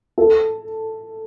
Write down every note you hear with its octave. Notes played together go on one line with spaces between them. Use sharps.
A4